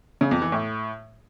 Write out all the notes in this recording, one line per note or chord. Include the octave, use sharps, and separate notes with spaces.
C#3
F2
E3
A2